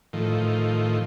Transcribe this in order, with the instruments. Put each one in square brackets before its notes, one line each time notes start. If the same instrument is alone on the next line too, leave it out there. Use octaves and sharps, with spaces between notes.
[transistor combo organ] A2 D#3 F3